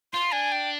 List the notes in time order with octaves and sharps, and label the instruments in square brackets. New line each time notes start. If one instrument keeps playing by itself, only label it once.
[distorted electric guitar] F4 [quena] C6
[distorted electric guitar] D4 [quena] G#5
[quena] G5